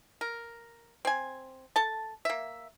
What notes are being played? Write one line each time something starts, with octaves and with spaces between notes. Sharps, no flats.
A#4
C4 G#5
A4 A5
A#3 E5